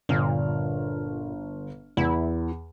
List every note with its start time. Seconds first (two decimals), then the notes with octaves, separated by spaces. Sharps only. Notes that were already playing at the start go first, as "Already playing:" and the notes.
0.09 G1 A#2 F6
1.97 E2 E4